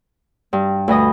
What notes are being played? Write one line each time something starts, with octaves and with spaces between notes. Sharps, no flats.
G2
D2 B4 D#5 D#6